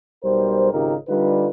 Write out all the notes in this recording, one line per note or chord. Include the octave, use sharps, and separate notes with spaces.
B1 G3 A#4 C5
G#1 C#3 D#4 F4 G4 A#4
D3 G3 D#4 F4 B4